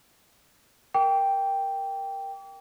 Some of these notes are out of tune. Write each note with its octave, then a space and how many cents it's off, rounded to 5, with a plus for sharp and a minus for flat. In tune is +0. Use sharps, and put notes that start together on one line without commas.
A#4 +0 G5 +0 D6 -40